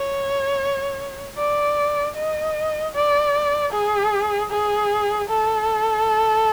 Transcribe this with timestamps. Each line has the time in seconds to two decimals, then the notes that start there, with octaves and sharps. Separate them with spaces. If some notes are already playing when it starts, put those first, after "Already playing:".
Already playing: C#5
1.38 D5
2.16 D#5
2.95 D5
3.72 G#4
4.51 G#4
5.29 A4